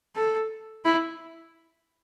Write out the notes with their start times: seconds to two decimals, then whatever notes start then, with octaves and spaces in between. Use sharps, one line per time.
0.16 A4
0.85 E4